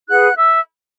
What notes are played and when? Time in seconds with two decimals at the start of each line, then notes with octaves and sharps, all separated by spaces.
0.08 E4 G#4 B4 F#5 F#6
0.36 E5 E6